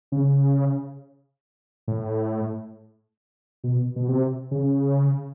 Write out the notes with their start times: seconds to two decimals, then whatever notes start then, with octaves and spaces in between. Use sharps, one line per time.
0.12 C#3
1.88 A2
3.64 B2
3.96 B2
4.08 C3
4.51 C#3